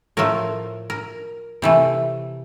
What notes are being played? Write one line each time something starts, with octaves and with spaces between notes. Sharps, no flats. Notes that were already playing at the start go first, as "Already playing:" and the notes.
A2 F3 A3 A#4
A#4
C3 E3 A3